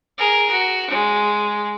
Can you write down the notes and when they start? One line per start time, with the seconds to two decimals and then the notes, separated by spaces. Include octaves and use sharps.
0.18 G#4 A#4
0.51 F#4
0.91 G#3